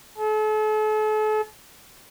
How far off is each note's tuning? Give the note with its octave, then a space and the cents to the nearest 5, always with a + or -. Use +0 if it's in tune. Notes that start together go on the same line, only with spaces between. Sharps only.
A4 -40